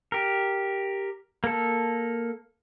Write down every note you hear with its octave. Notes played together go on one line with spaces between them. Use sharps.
G4 A#4
A#3 A4